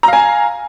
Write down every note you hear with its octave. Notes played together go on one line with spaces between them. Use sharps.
F5 G#5 A#5